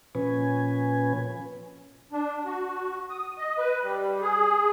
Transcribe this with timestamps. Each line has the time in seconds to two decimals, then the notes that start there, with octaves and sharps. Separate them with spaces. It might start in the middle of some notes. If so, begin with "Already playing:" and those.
0.15 A#2 F3 C#4 B4 G#5
2.12 D4
2.45 F#4
3.10 D#6
3.38 D#5
3.58 B4
3.83 G3
4.21 G#4